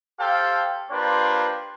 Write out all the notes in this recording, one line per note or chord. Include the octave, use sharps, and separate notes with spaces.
G4 A4 C5 F5 G5 A5
A#3 D4 F4 G4 B4 C5